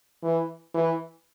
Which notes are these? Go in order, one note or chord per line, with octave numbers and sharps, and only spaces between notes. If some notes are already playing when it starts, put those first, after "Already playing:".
E3
E3